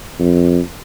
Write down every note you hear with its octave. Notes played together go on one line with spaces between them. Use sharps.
F2